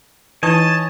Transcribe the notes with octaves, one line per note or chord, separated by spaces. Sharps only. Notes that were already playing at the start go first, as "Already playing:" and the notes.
E3 D#4 E4 C#5 D#5 G#5 A5